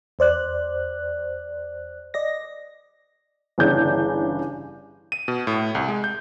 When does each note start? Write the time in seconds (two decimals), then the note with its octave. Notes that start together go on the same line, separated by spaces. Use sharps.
0.19 E2 C5 D5 F#6
2.14 D5 D#5 A#6
3.58 G1 C#3 E3 D4 G6
5.12 D#7
5.28 B2
5.47 A2
5.75 C2
5.88 G#3
6.04 G6